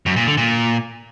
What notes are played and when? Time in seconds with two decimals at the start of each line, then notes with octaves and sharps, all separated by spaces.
0.06 F#2
0.16 A#2
0.27 D3
0.37 A#2